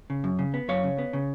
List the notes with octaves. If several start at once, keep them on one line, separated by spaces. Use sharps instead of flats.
C#3
F#2
C#3
B3
F#2 C#5 F5
C#3
B3
C#3